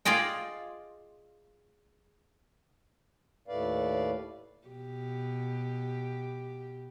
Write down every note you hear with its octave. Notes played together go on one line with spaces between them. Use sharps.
F4 G#4 D5 D#5 G5
D#2 A2 A3 B4 D5 F5
B2 G4